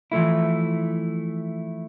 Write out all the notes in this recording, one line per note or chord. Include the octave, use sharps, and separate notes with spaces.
E3 F3 A3 E4